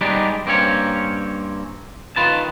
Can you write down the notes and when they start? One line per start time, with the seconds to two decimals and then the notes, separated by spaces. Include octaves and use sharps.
0.01 G3 G#3 B3 D4 D#4 G4
0.46 G2 A#3 C4 C#4 C#5
2.16 D#3 F4 B4 A5